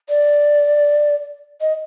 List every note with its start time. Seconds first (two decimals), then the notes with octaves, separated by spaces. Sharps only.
0.09 D5
1.61 D#5